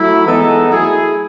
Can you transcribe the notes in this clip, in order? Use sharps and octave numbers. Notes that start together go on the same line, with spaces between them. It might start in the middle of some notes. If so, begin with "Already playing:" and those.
Already playing: F#3 A3 E4
E3 G#3 B3 D#4 A4
F#3 A3 E4 G#4